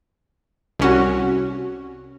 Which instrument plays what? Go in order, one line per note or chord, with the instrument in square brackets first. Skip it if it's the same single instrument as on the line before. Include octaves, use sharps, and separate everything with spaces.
[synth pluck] C2 C#4 F#4